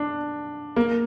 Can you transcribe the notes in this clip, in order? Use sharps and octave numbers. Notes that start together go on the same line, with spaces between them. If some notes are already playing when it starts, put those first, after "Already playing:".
Already playing: D4
A#3